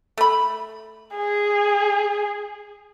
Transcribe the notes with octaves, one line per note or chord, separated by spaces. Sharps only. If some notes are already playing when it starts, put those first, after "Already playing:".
A3 B5
G#4